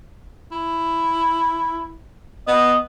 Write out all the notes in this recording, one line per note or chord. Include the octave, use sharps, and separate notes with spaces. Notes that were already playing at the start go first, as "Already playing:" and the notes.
E4
B3 D#5